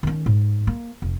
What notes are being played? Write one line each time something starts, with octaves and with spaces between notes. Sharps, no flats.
D#3 C#4
G#2
A#3
F1